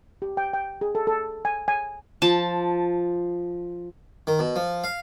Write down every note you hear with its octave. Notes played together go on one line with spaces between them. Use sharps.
G4
G5
G5
G#4
A4
A4
G#5
G#5
F3 A5
D#3
B2
F3
F5